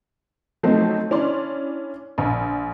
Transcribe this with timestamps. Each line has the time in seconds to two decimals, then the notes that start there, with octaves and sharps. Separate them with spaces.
0.63 F3 F#3 A3 C4 D#4
1.11 C#4 D4 E4 D5 C6
2.18 A#1